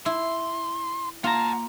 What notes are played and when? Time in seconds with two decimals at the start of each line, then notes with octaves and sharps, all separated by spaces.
0.06 E4 C6
1.24 A#3 F4 F#5 A5 A#5